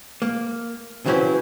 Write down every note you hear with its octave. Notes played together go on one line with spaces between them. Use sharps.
A#3
C#3 E3 F#3 C4 C#4 E4